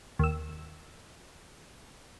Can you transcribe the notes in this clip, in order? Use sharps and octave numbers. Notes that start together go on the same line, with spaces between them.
D#2 E6